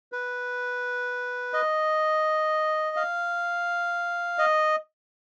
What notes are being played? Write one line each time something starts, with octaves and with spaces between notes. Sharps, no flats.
B4
D#5
F5
D#5